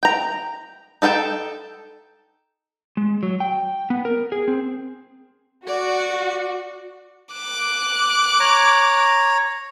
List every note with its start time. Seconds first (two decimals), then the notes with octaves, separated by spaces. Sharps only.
0.03 G5 A#5
1.02 D#4 A4 F5 G5 A5
2.97 G#3
3.23 F#3
3.40 G5
3.90 B3
4.05 A#4
4.32 G#4
4.48 C4
5.67 F#4 D5
7.33 D6 F#6
8.40 C#5 A#5